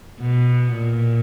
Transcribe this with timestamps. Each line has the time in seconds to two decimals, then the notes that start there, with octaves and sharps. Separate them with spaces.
0.20 B2
0.74 A#2